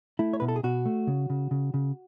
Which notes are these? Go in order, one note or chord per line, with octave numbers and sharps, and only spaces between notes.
A3 E4
C#5
B2 B4
A4
G#4
B2 F#4
A3
C#3
C#3
C#3
C#3